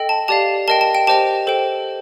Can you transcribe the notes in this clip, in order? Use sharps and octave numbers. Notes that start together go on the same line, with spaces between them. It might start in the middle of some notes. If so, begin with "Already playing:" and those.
Already playing: A4 D#5 G5
A5
G4 D5 F5 A5
A#4 D#5 G5 A5
A5
G5
G4 C5 D#5 G5 A5
A4 C5 G5